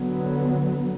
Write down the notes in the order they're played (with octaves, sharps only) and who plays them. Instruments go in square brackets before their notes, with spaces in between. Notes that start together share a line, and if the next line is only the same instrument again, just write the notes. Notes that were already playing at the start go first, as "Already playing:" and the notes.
Already playing: [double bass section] D3 F#3 B3